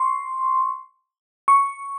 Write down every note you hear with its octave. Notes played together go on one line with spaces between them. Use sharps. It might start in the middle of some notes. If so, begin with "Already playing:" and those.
Already playing: C6 C#6
C#6